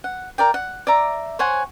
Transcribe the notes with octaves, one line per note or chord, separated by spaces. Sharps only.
F#5
A#4 D5 G5
F#5
D5 E5 A#5 D6
C5 C#5 F#5 G#5